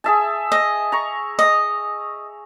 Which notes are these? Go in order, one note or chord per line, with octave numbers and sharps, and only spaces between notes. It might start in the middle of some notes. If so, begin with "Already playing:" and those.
G#4 E5 A5
D#5
A#5 C#6
D#5